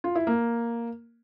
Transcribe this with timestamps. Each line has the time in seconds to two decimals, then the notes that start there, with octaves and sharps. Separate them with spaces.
0.04 F4
0.15 E4
0.27 A#3